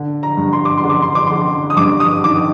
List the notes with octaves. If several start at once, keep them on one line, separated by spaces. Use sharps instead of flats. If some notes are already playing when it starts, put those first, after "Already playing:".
Already playing: D3
A#5
G2
C6
D6
C6
D3
D6
C6
D6
D3 C6
D#6
G2 D6
D#6
D#3 D6